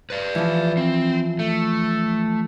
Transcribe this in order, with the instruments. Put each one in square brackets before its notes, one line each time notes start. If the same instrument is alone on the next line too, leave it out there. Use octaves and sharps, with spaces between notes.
[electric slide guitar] B4 D5
[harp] E3 F3
[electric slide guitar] C4
A3